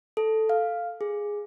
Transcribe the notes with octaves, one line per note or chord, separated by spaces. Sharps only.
A4
F5
G#4